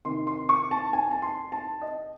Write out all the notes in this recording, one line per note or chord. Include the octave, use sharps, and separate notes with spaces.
C3 D#3 C6
C6
C#6
A5
G#5
A5
C6
A5
D#5